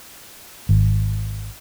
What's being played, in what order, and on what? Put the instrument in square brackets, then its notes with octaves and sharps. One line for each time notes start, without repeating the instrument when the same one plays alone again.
[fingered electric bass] G#1